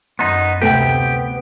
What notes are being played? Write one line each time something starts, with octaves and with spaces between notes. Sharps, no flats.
F#2 B3 D#4 C6
D2 C3 A3 B3 G4 G5